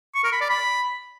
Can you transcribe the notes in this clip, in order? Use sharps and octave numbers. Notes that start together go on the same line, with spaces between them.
C#6
A#4
B5
D5
B5